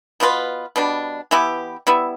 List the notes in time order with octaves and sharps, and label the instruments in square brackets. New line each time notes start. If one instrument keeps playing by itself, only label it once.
[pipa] B2 B3 F4 B4
B2 G3 D4
E3 B3 E4 G4
G3 B3 E4